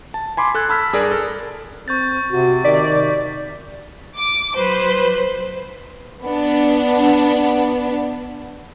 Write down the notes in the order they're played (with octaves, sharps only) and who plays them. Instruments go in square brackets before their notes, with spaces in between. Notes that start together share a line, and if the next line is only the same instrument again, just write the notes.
[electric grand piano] A5
G#5 B5 C6 D6
A4 F#6 G#6
A5 B5 E6 F6 B6
G2 G#4 A#4 D5
A4 A#4
[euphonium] C4 [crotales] C#6 G6 A6
[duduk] C3 [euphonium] F#4
[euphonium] D#3 [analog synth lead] D5 [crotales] B6
[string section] D6
F#3 B4 C5
[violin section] B3 D4